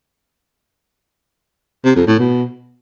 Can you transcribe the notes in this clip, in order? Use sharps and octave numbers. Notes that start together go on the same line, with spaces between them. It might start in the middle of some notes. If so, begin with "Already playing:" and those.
C3
F2
A2
B2